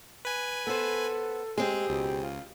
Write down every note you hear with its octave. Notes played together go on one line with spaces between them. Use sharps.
B4 G#5
B3 A4 C5
G#3 C4 G4 G#4
C#2 B2
F4